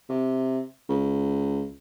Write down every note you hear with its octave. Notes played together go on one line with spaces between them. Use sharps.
C3
C#2